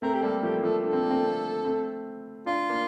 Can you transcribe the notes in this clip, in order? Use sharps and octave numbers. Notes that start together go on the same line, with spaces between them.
A3 C4 A#4
G4
G3 A#3 A4
F3 A3 G4
A#3
F3 A3 A4
D4 A4
C4
A#3
A3 C4
A3 C4
A3 C4
D4 F4
A#3 D4